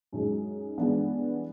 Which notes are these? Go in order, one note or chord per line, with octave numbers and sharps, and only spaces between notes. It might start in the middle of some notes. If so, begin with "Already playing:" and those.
F#2 D#3 G#3
G2 E3 G#3 B3 D4